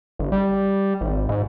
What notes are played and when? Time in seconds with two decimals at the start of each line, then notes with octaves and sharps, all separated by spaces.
0.19 G1
0.32 G3
1.01 G#1
1.29 G#2